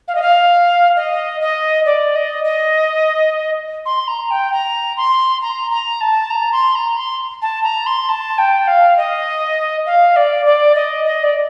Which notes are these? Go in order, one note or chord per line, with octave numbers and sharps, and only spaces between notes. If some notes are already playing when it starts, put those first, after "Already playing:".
F5
D#5
F5
D#5
D#5
D5
D#5
D#5
C6
A#5
G5
A#5
C6
A#5
A#5
A5
A#5
C6
A#5
C6
A5
A#5
C6
A5
G5
F5
D#5
F5
D5
D5
D#5
D#5
D5